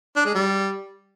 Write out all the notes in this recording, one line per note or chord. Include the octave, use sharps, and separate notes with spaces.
D4
G#3
G3